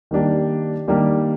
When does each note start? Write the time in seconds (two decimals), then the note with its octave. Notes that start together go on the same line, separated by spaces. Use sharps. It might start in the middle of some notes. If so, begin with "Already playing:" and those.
0.11 D#3 G3 A#3 D4 G4
0.88 D#3 G3 A#3 D4 G4